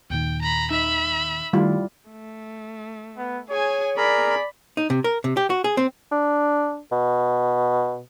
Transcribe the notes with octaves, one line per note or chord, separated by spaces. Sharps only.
D#2 A#2 D#3 G5
A#5 B5
D#4 E5 B5
D#3 G3 A3 E4 F4
A3
B3
G#4 C#5 G#5
G#4 A#4 D5 A#5 B5
D#4
C3
A#4
C3
G4
F#4
G#4
C4
D4
B2